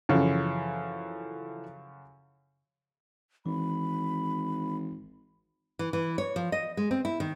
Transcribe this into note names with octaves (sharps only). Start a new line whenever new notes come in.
F#2 C#3 E3 F3 A4
G#1 E3 B5
E3
E3
C#5
F3
D#5
G#3
C4
E4
D#3